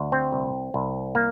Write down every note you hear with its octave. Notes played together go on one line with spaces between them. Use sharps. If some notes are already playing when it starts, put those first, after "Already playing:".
Already playing: D2
C4
C2
C2
A#3